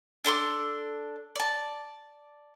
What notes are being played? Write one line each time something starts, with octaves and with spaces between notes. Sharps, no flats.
D4 A4 C6 D6
D5 A5